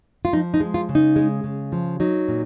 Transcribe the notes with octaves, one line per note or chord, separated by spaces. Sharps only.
F4
F3 D#4
D#4
G#3
F4
C#3
D#4
G#3
C#3
F3
F#3 D#4
A#2